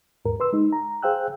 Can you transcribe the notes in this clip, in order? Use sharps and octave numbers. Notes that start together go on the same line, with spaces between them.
D#2 G#2 A#4
B4 C6 E6
G#3 D#4
A#5
G#4 C5 F5 G5 E6 F#6